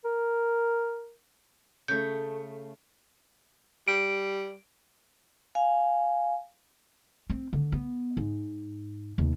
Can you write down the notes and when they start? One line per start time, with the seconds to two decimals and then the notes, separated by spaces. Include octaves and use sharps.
0.05 A#4
1.88 C#3 A3 G6
3.88 G3 D7
5.55 F5 G#5
7.30 C4
7.53 D3
7.72 B3
8.17 G#2
9.18 D#2 C3